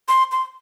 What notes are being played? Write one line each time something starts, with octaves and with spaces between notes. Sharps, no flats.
C6
C6